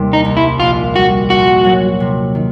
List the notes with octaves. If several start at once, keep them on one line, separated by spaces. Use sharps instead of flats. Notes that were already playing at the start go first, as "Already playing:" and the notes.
Already playing: D#2 C3 G3
D#4
C2
E4
A#1 F4
G3 F#4
A#1 F#4
F#3
C3
D#3